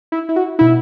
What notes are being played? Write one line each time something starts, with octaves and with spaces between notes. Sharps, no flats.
E4
E4
F#4
B2 E4